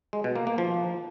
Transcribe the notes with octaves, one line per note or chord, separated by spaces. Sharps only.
G#3
B2
A#3
A#3
F3